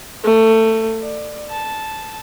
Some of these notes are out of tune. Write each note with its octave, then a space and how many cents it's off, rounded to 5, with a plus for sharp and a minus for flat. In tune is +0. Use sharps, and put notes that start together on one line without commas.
A3 +20
D5 +25
A5 -10